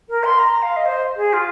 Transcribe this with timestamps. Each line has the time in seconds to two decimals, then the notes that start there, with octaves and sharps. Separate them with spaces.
0.09 A#4
0.24 C6
0.39 A#5
0.62 F5
0.76 D#5
0.85 C5
1.16 G#4
1.33 F4